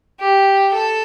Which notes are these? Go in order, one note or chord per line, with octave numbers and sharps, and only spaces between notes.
G4
A4